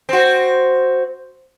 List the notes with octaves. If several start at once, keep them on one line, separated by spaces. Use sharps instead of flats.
C4 F#4